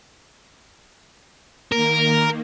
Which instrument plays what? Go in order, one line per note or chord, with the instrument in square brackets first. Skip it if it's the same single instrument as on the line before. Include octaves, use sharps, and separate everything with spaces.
[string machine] D#3 A#3 [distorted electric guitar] A#4